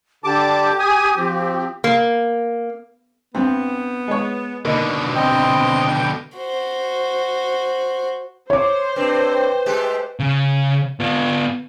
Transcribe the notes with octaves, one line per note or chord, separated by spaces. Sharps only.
D3 G4 A5 D6
G#5 D#6
F3 C4
A#3
G2 B3 C4
G#3 C#5
B2 D3 A#3 D#4
C4 D#5 G5
F#4 C5
C5 C#5 D6
G2 C4 B4
G#3 A3 G4
C#3
B3 F4